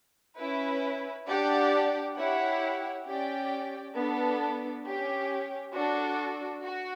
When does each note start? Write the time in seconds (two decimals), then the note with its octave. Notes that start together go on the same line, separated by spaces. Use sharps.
0.38 C#4 E4 B4
1.27 D4 G4 D5 F#5
2.17 E4 G4 C#5 F#5
3.06 C#4 G4 D5 G5
3.96 B3 D4 A4
4.85 C#4 G4 C#5
5.75 D4 F#4 A4
6.64 F#4